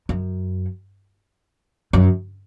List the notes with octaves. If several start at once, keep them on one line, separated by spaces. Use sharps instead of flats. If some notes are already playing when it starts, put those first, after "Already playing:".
F#2
F#2